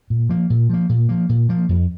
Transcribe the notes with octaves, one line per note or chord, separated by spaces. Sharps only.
A#2
F3 A#3
A#2
F3 A#3
A#2
F3 A#3
A#2
F3 A#3
F2